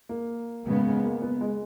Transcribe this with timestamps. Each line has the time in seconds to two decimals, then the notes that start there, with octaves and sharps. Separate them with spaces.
0.09 A#3
0.65 C#3 G#3 B3
1.04 A#3
1.22 B3
1.41 G#3